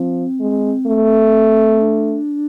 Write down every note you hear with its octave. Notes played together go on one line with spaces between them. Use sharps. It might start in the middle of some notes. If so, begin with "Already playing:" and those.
Already playing: F3 C4
G#3
A3
D4